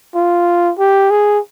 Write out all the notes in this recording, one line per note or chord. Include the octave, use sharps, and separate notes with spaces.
F4
G4
G#4